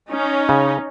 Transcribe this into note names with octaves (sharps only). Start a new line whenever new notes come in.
C#4 D#4
C#3